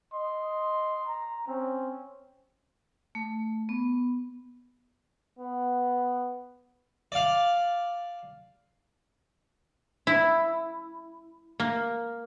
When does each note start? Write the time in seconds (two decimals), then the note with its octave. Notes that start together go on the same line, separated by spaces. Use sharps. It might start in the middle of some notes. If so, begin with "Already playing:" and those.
0.14 D#5 C6
1.06 A#5
1.48 C4 C#4
3.15 A3
3.69 B3
5.39 B3
7.12 D5 F5
10.07 E4
11.60 A#3